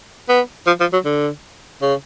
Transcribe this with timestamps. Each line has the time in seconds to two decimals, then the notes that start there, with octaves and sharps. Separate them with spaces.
0.29 B3
0.67 F3
0.80 F3
0.93 F#3
1.05 D3
1.82 C#3